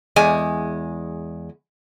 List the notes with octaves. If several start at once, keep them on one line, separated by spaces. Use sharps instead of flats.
E2 G#3 G#5